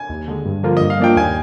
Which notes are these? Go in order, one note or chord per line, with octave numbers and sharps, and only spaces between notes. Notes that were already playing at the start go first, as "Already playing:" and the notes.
Already playing: G#5
D#2
D3 G#3
G2
D3 F3 A#3 F4
G2 D#5
F5
F3 A#3 D4 F4 G5
D#2 G#5